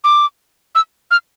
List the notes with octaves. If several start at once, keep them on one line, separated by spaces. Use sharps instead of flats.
D6
E6
F6